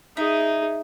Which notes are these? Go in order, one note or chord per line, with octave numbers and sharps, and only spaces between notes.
D#4 E4 G#4